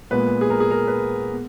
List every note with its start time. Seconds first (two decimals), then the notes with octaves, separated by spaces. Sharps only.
0.11 A#2 G#3 B3 B4
0.41 G#4
0.50 A#4
0.60 G#4
0.71 A#4
0.87 B4
1.32 B3